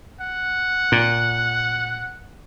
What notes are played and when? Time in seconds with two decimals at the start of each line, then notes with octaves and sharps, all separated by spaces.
0.21 F#5
0.92 A#2